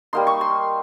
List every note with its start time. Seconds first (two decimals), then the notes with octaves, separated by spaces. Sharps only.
0.13 G3 A#3 D#4 C6
0.27 C#6
0.41 C6